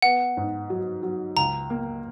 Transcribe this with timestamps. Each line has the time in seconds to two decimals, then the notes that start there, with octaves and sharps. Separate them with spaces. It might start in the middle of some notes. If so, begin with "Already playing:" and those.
0.02 B3 F#5
0.37 G#2
0.70 F#3
1.03 F#3
1.37 C#2 A#5
1.70 A#3